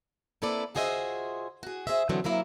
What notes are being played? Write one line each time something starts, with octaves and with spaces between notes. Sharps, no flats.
A#3 C4 E4 A4 B4 D5
F4 F#4 G#4 C5 D#5 E5
F#4 G#4
G#4 C5 D#5 E5
D3 E3 F#3 B3 C4
C3 F#3 A#3 E4 A#4